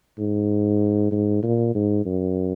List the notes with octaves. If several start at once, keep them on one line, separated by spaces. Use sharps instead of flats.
G#2
G#2
A#2
G#2
F#2